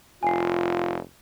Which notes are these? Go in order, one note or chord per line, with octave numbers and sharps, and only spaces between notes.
F1 F4 G#5 C7